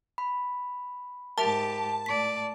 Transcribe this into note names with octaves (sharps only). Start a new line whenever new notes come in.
B5
G#2 G4 A#4 E5 A5 F7
A2 D5 B6